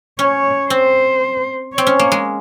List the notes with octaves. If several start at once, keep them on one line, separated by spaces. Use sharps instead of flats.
C#4 C#5
C4 C5
C4 C#5
C#4
A#3
G#3